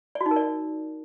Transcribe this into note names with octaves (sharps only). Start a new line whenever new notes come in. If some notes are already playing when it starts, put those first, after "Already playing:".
D5
F#4
D#4
A#4
D5